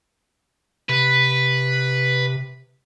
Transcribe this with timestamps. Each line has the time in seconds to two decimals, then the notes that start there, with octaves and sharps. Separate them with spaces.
0.89 C3 B4